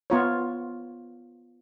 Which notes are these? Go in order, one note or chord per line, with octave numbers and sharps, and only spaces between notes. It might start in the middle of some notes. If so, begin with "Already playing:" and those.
B3 F4 C#5